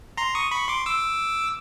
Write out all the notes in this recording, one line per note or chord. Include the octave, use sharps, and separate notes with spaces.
A#5 C6
C#6 D#6
B5 C#6
C6 D6
D6 E6